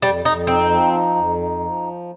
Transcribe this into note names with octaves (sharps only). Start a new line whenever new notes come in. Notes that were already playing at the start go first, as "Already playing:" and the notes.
F2 G3
F2 D#4
C4 D#4
F3
D#4
F2
D#4
F3